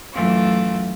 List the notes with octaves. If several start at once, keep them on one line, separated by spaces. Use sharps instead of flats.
F#2 E3 A3 F4 D6